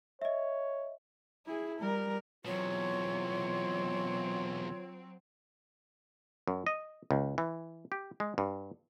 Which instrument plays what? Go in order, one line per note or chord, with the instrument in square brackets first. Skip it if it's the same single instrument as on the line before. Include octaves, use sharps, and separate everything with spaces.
[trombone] C#5 [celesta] D#5 E5
[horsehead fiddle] E4 G#4
[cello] G3 [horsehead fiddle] A#4
[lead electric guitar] E2 B2 [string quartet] F#3 C4 [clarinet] F4 [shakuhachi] C#5
[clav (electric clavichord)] F#2
D#5
C#2
E3
G4
G#3
G2